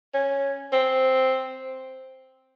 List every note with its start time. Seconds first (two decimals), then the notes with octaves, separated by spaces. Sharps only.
0.14 C#4
0.73 C4